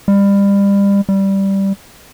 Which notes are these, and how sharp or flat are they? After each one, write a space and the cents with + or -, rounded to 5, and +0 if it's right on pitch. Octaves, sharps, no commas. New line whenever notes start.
G3 +30
G3 -5